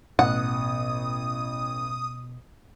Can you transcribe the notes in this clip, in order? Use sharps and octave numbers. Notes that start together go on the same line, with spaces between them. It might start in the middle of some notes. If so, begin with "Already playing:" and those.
A1 B2 F#5 D#6